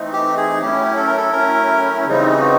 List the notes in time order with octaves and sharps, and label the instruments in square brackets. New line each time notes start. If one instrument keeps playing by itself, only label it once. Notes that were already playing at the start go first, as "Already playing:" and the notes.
Already playing: [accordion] E3 A3 C4 D#4
[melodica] G4
G#4
[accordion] F#3 A3 C#4 E4 [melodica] G4
[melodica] A4
A#4
A4
[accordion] F#3 A3 C#4 E4 [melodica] A#4
[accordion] C#3 E3 G3 C4 D#4
[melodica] F#4